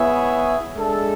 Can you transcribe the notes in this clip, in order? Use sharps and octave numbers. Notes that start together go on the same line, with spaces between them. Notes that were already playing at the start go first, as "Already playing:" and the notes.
Already playing: B3 E4 G#4 C#5 E5
G#3 D4 A4 E5